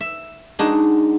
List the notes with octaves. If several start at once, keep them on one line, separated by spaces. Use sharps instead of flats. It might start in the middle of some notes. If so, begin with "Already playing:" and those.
E5
G#3 D4 D#4 F#4 G#4